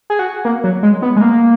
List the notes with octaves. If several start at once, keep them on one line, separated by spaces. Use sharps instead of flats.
G#4
F#4
A#3
F#3
G#3
B3
G#3
A#3